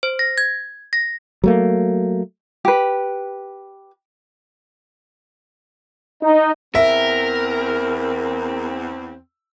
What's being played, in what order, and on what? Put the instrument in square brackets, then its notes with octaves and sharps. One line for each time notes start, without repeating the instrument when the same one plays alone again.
[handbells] C5
A#6
G#6
A#6
[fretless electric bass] F#3 A3 A#3
[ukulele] G4 B4
[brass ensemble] D#4
[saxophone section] E2 C4 [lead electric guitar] A#4 [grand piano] E5